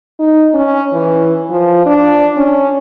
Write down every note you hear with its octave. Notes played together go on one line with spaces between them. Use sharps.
D#4
C#4
E3
F3
D4
C#4